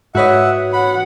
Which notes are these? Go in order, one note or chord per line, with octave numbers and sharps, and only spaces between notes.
G#2 F#4 B4 C#5 D#5 E5 F#5
F#5 B5